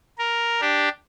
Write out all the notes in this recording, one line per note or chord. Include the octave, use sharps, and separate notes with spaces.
A#4
D4 G4